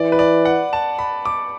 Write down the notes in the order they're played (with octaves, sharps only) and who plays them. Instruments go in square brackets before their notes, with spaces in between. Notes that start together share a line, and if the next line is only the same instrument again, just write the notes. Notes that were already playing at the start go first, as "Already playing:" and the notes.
Already playing: [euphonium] E3 [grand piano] D5
[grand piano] B4
D5
F#5
A5
B5
D6